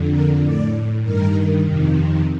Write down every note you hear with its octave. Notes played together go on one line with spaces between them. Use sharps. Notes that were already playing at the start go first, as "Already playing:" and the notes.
Already playing: F2 D3
A#4
A2 D5
G2 D#3 A#4
F2 C3 D#3